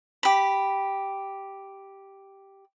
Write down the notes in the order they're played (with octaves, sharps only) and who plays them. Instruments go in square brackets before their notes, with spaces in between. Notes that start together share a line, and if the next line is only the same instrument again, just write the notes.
[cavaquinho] G4 B5